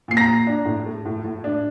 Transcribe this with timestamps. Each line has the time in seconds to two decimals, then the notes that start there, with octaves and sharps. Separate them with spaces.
0.08 A#2 C7
0.17 A#5 A#6
0.27 A#2
0.47 D4
0.65 A2
0.86 A3
1.05 A2
1.24 A2
1.44 D4